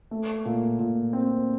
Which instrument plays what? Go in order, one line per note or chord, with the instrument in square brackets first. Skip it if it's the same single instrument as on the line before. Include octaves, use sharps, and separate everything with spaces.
[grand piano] A3
A#2
A#2
C4